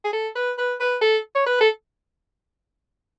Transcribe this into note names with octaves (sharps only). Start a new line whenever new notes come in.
G#4
A4
B4
B4
B4
A4
C#5
B4
A4